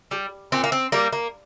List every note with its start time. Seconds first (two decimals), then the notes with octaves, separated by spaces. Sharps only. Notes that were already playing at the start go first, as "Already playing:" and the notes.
0.11 G3
0.52 A#2 C4
0.64 A#3
0.72 C4
0.92 G3 A#3
1.13 A#3